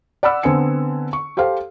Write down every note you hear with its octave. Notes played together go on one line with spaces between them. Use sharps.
D5 F#5 B5 E6
D3 B3 C4 G#5 C#7
C#6
G4 A4 C5 F5